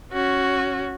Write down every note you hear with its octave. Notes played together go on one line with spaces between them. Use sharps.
C#4 F#4